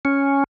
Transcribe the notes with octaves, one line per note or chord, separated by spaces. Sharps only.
C#4